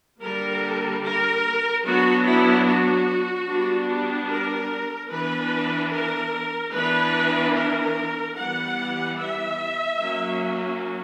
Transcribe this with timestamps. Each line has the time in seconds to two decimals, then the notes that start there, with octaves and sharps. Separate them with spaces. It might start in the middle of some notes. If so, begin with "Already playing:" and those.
0.20 D3 G3 A#3 A#4
1.01 A#4
1.83 F#3 B3 D4 F#4
2.24 E4
2.64 F#4
3.46 G3 B3 D4
4.29 A#4
5.10 E3 B3 D4 B4
5.91 A#4
6.73 E3 B3 D4 B4
7.55 A#4
8.36 E3 G3 B3 F#5
9.19 E5
10.00 F#3 A#3 C#4